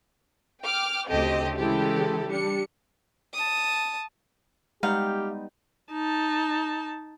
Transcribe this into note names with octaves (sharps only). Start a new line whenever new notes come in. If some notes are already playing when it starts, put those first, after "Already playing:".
G5 D6 F6
D2 C#3 C4 G4 A4 D#5
C#3 E3 G#3 E4 G4 A4
G3 D4 C#7
A5 D#6
G3 G#3 B3 D#4 G4 F5
D#4 A5